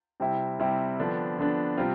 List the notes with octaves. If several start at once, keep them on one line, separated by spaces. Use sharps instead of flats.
C3 G3 C4 E4
C3 G3 C4 E4
D3 F3 B3 D4
D3 F3 B3 D4
C3 G3 C4 F4